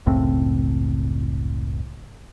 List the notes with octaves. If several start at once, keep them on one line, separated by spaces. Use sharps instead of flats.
F#1 C#2 A2 C4